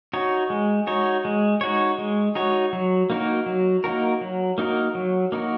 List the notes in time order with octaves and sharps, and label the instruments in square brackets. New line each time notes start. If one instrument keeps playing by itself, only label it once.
[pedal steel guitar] D#4 F#4 C#5
G#3
D#4 F#4 C#5
G#3
D#4 F#4 C#5
G#3
D#4 F#4 C#5
F#3
A#3 D#4 F#4 A#4
F#3
A#3 D#4 F#4 A#4
F#3
A#3 D#4 F#4 A#4
F#3
A#3 D#4 F#4 A#4